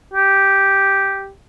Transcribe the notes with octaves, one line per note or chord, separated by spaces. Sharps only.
G4